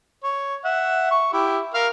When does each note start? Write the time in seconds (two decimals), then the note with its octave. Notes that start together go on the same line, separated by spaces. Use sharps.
0.23 C#5
0.65 E5 F#5
1.11 C#6
1.33 E4 G4
1.74 A#4 F5